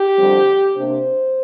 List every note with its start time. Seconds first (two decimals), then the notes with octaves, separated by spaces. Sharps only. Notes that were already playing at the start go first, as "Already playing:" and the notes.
Already playing: G4
0.17 F2 D3 G3 C4
0.76 C3 A#3 D4 C5